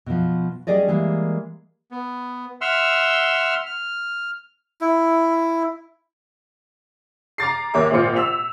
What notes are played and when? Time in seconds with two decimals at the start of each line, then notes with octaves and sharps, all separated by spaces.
0.06 B2 F3
0.67 G3 C#4 G4 G#4 D5 D#5
0.88 E3 G3 G#3 A#3
1.91 B3
2.61 E5 F#5 C6 E6 F6
3.66 F6
4.81 E4
7.38 A#5 D6 A6 C7
7.74 G#1 D#2 A#3 C#5 E5 D6
7.91 G#1 A#2 C4 F4 C#7
8.16 E6 B6 F7